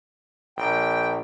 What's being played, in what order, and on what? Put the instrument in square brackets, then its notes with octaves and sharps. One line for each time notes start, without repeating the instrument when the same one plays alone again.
[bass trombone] A#1 [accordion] G5